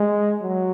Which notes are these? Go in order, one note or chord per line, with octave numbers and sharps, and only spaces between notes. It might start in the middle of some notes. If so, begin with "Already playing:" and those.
Already playing: G#3
F#3